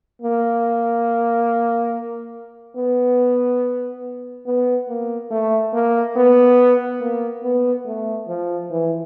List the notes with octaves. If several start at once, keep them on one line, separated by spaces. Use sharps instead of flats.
A#3
B3
B3
A#3
A3
A#3
B3
A#3
B3
A3
F3
E3